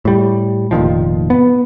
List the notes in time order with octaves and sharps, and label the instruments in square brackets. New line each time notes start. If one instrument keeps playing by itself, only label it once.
[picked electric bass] A2 G3
F1 A#2 D#3 F3
B3